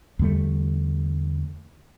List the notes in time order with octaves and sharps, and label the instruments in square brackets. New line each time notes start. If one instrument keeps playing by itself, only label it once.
[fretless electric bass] E2 D3 G3 A3